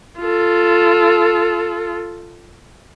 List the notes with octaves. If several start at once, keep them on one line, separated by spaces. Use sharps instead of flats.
F4 A4